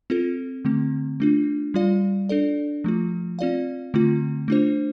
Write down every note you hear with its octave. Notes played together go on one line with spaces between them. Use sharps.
C4 F4 A4
D3 A3 C4
A3 D4 F4
G3 F4 D5 F5
D4 A4 D5
F3 A3 F4
C4 F4 D5 F5
D3 A3 C4 F4
A3 D4 F4 C5